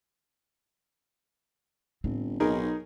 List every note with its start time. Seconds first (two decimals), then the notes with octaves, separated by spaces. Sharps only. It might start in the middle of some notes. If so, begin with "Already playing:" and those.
2.04 G1 A2 C4
2.40 B1 D#4 G#4 A#4